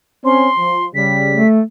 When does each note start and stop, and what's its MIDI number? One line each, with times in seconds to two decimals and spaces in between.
0.25 0.48 60
0.25 0.48 61
0.25 0.85 84
0.58 0.86 53
0.95 1.40 49
0.95 1.40 55
0.95 1.47 95
1.33 1.61 57